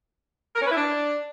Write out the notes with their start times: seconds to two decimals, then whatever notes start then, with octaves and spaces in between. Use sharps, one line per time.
0.55 A#4
0.60 C#4
0.66 B4
0.71 E4
0.76 D4